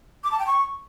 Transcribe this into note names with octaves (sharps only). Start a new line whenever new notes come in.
D6
A5
G5
C#6